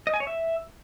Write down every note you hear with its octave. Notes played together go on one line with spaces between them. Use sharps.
D#5
G#5
C#5
E5